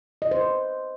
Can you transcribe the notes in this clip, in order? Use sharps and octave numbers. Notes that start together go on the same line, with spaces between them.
D#5
C5
B4